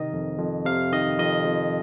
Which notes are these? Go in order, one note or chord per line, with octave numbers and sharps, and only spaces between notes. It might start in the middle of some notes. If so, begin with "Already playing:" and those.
Already playing: C3 D#3 D#5
F2
F2
C3 F5
D#3 D#5
F2 D#5
F2